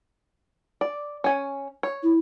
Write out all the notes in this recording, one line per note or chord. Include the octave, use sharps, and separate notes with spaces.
D5
C#4 G#5
C#5
E4